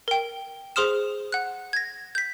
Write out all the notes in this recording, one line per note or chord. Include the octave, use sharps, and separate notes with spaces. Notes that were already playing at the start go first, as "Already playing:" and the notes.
A#4 G5
G#4 C5 C6 D#6 F6 E7
F#5 F#6
G#6 A#6
G6 B6